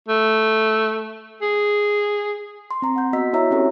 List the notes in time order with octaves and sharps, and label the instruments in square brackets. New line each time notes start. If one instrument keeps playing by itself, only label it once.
[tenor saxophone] A3
G#4
[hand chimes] C6
C4 A#5
F#5 G6
B3 F#4 D#5 E6 B6
E4 F#4 C#5 E5 A#5 E6
C4 C#4 G4 A4 C#5